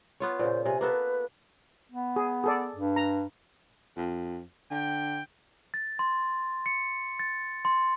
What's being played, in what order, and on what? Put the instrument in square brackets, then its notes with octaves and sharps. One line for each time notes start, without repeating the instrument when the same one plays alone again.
[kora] B3 F4 C#5
[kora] A#2 C#3 [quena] C5
[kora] C3 [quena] G#5
[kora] A#3 B3 A4 [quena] B4
[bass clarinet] B3
[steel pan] G#4
G#4 A4 D5
[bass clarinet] G2
[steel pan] A#5
[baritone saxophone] F2
[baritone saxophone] D3 [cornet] G5
[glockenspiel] A6
C6
C#7
A6
C6